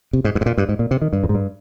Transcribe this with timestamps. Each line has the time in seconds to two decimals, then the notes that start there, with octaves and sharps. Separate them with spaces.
0.13 C3
0.24 G#2
0.35 G2
0.41 G#2
0.46 A#2
0.58 G2
0.69 G#2
0.79 A#2
0.91 C3
1.02 D#3
1.13 G2
1.23 F2
1.29 G#2
1.35 G2